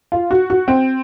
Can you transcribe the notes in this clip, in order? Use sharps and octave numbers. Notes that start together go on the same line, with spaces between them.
F4
F#4
F#4
C4